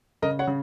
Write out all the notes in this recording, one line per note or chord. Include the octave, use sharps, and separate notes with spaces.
C#3 A#4 D#5
C#5 F#5
C#3